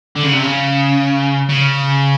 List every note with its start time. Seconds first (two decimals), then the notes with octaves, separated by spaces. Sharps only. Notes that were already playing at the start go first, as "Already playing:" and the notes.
0.15 D3
0.24 C#3
0.33 C3
0.43 C#3
1.49 C#3